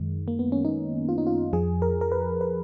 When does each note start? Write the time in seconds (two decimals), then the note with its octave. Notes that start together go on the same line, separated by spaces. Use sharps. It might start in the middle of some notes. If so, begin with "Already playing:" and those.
Already playing: F#2 D#3 G#3
0.28 A#3
0.39 B3
0.52 C#4
0.65 D#4
1.09 F4
1.18 D#4
1.27 F4
1.53 F2 F3 G#4
1.82 A#4
2.01 A#4
2.12 B4
2.41 B4